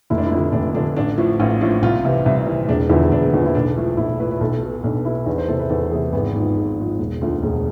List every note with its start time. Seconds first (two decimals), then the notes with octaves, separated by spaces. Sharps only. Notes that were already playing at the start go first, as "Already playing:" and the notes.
0.10 F1 E4
0.18 D4
0.26 E4
0.32 F2 D3
0.53 F1 D4
0.75 F2 D3 D4
0.96 A1 D4
1.18 A2 F3
1.40 A1 F4
1.61 A2 F3 D4
1.82 C2 F4
2.04 C3 E3
2.26 C2
2.46 C3 E3
2.68 E1 D4
2.90 E2 D3 F3 E4
3.12 E1 D4
3.34 E2 D3 F3
3.45 E4
3.55 B1 D4
3.76 A2 F3
3.97 B1 E4
4.20 A2 F3 B4
4.31 B4
4.41 B1 A4
4.62 B2
4.84 B1 D4
5.05 B2 E4
5.26 E2 D4
5.38 C5
5.48 C3 E3 A4
5.59 B4
5.69 E2 A4
5.91 C3 E3 G#4
6.13 G#1 B3
6.34 G#2 F3
6.56 G#1
6.78 G#2 F3
6.99 E1
7.21 D2 D3 F3
7.42 E1